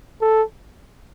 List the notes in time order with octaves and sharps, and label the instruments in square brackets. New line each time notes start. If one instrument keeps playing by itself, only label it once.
[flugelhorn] A4